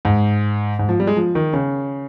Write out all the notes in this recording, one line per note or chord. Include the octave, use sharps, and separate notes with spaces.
G#2
G#2
F3
G3
G#3
F3
D#3
C#3